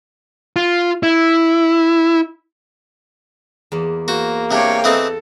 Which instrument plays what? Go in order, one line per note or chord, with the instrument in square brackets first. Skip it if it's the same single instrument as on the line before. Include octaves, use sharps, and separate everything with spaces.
[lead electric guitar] F4
E4
[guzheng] E2 A#3
[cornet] A#3 [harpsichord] F#4 [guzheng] C5
[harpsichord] C3 D4 [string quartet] C#5 F5 G5
[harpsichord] E3 C4 D#4 [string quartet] A4